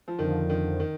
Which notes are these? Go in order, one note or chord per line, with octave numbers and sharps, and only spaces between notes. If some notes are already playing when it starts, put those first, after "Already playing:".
F3
F2 D3 D#3 F3
D#3
D#3